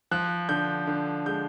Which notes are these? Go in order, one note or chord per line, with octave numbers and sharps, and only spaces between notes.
F3 F#6
D3 G6
D3
G#3 G6